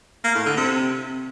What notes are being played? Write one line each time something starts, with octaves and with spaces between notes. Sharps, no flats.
A#3
A2
D3
C3